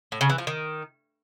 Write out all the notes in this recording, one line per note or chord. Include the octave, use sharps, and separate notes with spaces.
A2
C#3
E3
F3
D#3